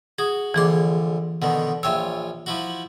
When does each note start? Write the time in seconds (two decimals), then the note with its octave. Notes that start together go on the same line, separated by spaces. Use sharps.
0.18 F#4 G#4 D#6
0.54 A#1 D3 E3 G#4 C6 D6
1.42 B2 D3 D#3 F#5
1.83 A#1 F4 C#5 E5 G5 E6
2.46 F3 E4 F#4